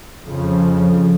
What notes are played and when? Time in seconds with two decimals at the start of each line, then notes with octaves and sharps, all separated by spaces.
0.24 F2 C#3 F3